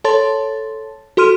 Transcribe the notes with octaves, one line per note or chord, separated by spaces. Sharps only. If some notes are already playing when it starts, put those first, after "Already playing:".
A4 C#5 A5 C6 A6
F#4 A4 C6 F6 D#7